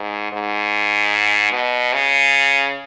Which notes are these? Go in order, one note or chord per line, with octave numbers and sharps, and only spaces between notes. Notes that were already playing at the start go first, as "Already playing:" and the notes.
Already playing: G#2
G#2
B2
C#3